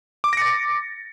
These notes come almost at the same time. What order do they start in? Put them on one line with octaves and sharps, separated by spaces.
D6 D7 A#6 C#7 A6